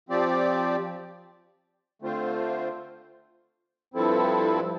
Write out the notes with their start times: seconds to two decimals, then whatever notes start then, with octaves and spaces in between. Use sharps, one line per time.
0.09 F3 C4 G4 D5
2.02 D3 A3 C4 F4 C5
3.94 G2 F3 C4 E4 A4